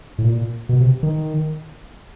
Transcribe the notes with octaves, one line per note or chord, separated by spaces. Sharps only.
A2
A#2
B2
C3
D#3